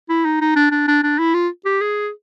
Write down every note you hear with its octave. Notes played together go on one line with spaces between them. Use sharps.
E4
D#4
D#4
D4
D4
D4
D4
E4
F4
G4
G#4